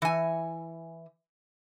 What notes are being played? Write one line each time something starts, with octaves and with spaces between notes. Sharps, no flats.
E3 G#5